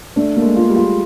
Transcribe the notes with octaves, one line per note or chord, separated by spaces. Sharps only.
A3 D4
A3 A#3
G#3
F4
G3
F4